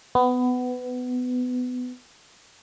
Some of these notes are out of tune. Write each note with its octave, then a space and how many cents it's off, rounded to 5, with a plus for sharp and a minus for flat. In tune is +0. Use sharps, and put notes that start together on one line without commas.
B3 +20